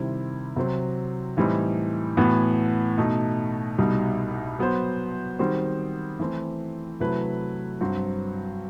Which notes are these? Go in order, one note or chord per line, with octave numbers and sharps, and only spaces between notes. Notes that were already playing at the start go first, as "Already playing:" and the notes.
Already playing: C3 D#3 G3 C4 E4
C3 F#3 C4
A2 E3 G3 C4 D#4
A2 E3 B3 F#4
B2 A3 D#4
C2 B2 G3 D#4
F#3 B3 F#4 C5
D#3 G3 C4 F#4 C5
E3 A3 C4
C3 F#3 A3 E4 B4
G2 F#3 C4 F#4 C5